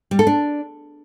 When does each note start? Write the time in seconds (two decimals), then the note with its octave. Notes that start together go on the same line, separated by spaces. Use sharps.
0.11 G3
0.19 A4
0.27 D4